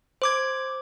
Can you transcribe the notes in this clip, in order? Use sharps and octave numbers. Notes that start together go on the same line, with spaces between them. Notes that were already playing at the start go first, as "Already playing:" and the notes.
C5 D6 G#6